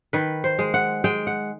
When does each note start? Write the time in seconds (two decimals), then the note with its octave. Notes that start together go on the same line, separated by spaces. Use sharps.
0.13 D#3 B4
0.44 C5
0.59 G#3
0.74 F#5
1.04 G#3 G5
1.27 F#5